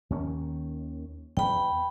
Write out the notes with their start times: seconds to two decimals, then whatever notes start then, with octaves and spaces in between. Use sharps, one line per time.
0.10 D#2 D#3 C#4
1.37 E2 G5 B5